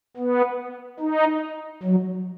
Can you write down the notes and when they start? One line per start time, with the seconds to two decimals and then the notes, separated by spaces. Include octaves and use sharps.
0.17 B3
1.00 D#4
1.83 F#3